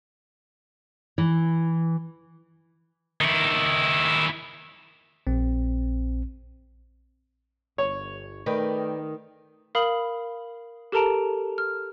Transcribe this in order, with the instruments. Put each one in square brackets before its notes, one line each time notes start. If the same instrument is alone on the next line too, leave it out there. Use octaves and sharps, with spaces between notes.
[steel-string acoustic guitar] E3
[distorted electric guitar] D#3 E4
[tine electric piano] A#1 C4
[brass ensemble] G1 [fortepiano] C#5
[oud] D#3 [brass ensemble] A3 [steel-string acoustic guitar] B4 D5 G5
[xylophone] A#4 F5 B5 D#6 F#7
G4 A4 A#4 A5 A#5 D7
F6